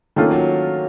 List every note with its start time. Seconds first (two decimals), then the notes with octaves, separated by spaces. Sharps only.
0.16 D#3 A3 A#3 C#4 F4 A4
0.31 F#3